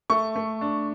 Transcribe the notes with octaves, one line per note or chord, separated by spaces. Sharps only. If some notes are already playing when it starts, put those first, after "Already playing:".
A3 C#6
A3
D4